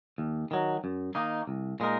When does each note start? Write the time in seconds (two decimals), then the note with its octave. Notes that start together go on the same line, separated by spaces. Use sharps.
0.18 D#2
0.51 D#3 F#3
0.84 F#2
1.15 D#3 A#3 D#4
1.47 C2
1.80 A#2 G#3 D#4 A#4